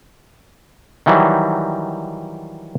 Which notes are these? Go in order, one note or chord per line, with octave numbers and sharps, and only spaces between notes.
D#3 E3 F#3 G3